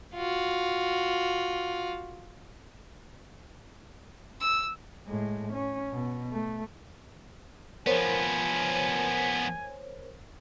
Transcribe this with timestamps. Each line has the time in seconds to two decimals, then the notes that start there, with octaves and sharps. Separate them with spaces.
0.15 F4 F#4
4.40 E6
5.07 A2 G#3
5.53 C#4
5.93 B2
6.32 A3
7.86 F3 B3 A#4 C5 C#5 G#5